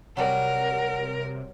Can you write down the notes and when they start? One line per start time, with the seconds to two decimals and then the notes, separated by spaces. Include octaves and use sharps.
0.17 C3 F#3 G3 A#4 F#5